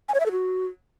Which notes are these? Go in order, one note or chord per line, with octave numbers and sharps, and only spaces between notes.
G#5
C#5
E5
A4
F#4